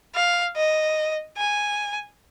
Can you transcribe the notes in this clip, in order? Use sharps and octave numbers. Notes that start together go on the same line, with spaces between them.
F5
D#5
G#5